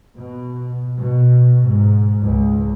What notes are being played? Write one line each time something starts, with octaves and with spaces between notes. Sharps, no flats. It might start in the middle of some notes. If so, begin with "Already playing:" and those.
B2
B2
G#2
C#2